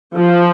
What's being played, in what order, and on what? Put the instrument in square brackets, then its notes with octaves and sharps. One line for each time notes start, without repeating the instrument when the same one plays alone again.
[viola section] F3